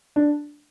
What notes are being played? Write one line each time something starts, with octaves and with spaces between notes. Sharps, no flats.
D4